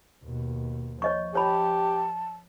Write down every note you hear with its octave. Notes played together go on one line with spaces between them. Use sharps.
D#2 B2
F3 C#5 D#5 C#6
G4 C#5 A5 B5